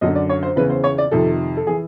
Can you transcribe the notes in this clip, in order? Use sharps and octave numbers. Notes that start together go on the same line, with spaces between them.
F#2 D3 D#5
D5
C#5
C5
E2 C#3 E3 B4
C5
C#5
D5
F2 C3 D#3 A4
A4
E3 G#4